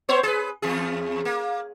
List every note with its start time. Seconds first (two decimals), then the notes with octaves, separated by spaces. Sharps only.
0.09 B3 C5 C#5
0.23 G#4 B4
0.62 E2 G#4
1.25 A#3